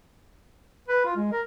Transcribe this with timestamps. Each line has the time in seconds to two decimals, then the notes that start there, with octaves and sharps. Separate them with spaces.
0.88 B4
1.05 F4
1.17 G#3
1.32 A#4